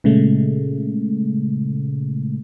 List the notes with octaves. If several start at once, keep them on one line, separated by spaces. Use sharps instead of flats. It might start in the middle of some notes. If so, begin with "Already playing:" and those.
A#2 C#3 G#3 A3